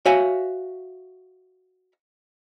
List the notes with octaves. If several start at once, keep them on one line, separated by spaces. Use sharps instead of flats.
F#4 C#5 E5 F5 G#5